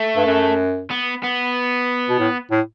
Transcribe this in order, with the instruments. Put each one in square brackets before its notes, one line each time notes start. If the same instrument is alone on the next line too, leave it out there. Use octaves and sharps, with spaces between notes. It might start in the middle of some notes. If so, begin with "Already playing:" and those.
Already playing: [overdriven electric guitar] A3
[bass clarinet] G2
F#2
[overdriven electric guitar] B3
B3
[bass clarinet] B2
A2
A2